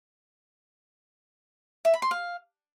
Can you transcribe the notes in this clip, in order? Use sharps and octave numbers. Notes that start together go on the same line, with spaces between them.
E5
B5
C6
F5